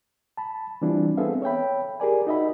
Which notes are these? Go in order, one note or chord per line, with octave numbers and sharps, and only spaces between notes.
A5 B5
E3 G3 C4 D4 E4 F4
B3 C4 G#4 A4 E5 F5
C#5 E5 G5 B5
G4 G#4 A#4 D5 G#5
D#4 F#4 D#5 E5 B5